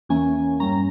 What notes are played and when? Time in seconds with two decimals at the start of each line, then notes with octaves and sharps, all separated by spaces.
0.09 E2 E3 A#3 C#4 G#5
0.60 G2 G3 A#3 C#4 A#5